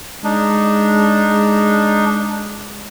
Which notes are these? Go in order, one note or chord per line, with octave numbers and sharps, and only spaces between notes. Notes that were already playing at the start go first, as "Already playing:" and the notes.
G#3 D4 D#4